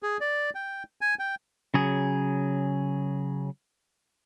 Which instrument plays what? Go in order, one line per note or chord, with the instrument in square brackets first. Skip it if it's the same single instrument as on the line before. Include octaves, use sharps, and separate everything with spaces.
[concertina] G#4
D5
G5
G#5
G5
[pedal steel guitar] C#3 F#3 G#4